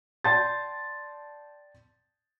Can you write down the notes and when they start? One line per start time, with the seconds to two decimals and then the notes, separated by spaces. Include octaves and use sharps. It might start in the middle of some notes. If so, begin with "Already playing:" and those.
0.24 D5 G5 A5 C6 G6 A6